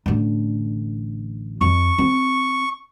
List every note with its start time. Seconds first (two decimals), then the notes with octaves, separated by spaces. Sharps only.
0.06 A1 D3
1.61 F2 C#6
1.98 C4